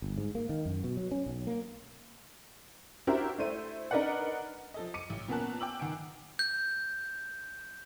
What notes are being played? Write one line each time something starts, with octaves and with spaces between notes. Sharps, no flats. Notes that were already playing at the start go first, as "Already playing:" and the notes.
G1
G#2
A#3
D#3
F#2
B2
F#3
C#4
B1
A#3
D4 E4 F#4 G4 A#4 C5
A3 E4 C5 D#7
D4 D#4 A#4 B4 D5 F#5
F3 A4 D#5
D6 C#7 D#7
A1
A#2 B3 C#4 A#4 A5 F#6
G5 D6 E6 F#7
D#3 F#5 G#5 D7
G6